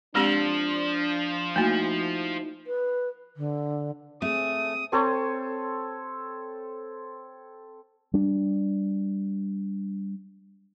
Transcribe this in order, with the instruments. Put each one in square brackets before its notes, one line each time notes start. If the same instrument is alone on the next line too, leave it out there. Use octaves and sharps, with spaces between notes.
[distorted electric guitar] F3 [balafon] G#3 C4 G4 [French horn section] D4
[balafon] A3 A#3 [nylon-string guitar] D#4 E4 F#4
[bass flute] B4
D3
[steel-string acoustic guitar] A3 [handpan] C4 G#4 [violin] D#6
[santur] C4 A4 C#5
[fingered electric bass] G3 D4